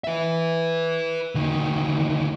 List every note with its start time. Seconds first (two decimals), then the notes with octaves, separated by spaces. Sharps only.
0.04 B4 E5
1.35 D2 D#3